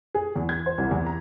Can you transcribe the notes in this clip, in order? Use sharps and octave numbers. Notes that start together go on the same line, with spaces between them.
G#4
E2
G#6
C5
C2
E2
A#5